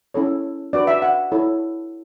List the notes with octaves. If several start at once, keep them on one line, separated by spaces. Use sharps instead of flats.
C#4 E4 A4 C#5
D4 F#4 B4 D5
E5
F#5
E4 A4 C#5